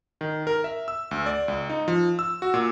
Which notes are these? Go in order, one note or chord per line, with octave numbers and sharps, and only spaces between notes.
D#3
A#4
E5
E6
D2
D5
C#2
D#4
F3
E6
F#4
A#2